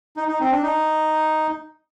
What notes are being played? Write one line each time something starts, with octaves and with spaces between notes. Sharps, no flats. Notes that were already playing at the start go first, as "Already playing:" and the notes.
D#4
D#4
C4
D4
D#4